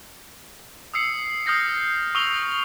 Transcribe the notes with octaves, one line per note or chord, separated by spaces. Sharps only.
D#6 E6 C7 C#7
D#6 F6 G6 A#6 C7
C#6 D#6 E6 F7 G7